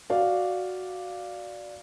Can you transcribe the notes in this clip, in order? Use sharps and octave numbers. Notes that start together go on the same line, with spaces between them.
F#4 D5 F5